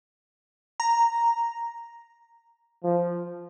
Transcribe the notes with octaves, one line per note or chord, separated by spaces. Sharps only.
A#5
F3